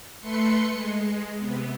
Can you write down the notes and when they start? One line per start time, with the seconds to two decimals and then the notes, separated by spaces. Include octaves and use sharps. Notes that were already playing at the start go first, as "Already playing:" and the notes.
0.20 A3 B4 C6 C#7
0.70 G#3
1.38 C3 B3